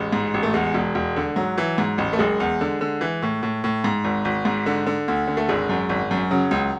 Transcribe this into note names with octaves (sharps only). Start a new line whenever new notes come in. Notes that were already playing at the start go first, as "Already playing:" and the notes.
Already playing: A1 G#3
G#2
A1
A3
E2 G#3
E1
E1
D3
G#2 F#3
E3
G#2
A1
A3
F#1 G#3
E2
D3
D3
E3
A2
A2
A2
G#2
G#1
G#1
G#2
D3
D3
D2
D3
A3
G#1 G#3
F#2
G#1
F#2
C#3 F#3
C#2